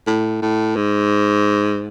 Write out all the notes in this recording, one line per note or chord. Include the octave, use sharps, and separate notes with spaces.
A2
A2
G#2